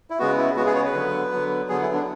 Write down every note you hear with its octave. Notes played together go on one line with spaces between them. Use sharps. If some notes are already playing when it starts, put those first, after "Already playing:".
E4
C#3 G#3 B3 F#4
E4
C#3 G#3 B3 F#4
G#4
C#5
B4
D3 F#3 B3
D3 F#3 B3
D3 F#3 B3 G#4
E4
D4